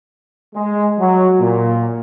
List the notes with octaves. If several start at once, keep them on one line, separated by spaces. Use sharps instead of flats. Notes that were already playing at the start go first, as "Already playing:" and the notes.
G#3
F#3
A#2